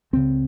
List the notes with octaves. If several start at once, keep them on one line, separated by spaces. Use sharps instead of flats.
C#2 C#3 C4